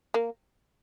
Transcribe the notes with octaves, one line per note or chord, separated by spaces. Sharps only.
A#3